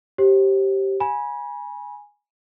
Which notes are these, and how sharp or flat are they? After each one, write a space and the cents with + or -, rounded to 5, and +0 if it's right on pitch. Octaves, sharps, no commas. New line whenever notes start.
G4 -10 C5 +40
G#5 -5 B5 -30